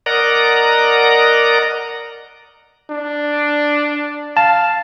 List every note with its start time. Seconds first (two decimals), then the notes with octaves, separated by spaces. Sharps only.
0.06 A#4 D5 D#5 F#5 A#5
2.91 D4
4.37 F5 A5